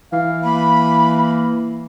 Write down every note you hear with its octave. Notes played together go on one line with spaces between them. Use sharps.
E3 F5
A#3 B5